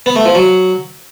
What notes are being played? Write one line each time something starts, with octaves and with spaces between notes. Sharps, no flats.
B3
A3
F3
F#3